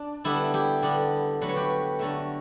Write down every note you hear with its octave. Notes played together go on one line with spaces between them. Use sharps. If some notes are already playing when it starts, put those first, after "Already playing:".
Already playing: D4
D3 G3 B3 D4 E4
E4 G4
D3 G3 B3 D4
D3 F#3 A3 B4
C#5
G4 B4
D3 F#3 A3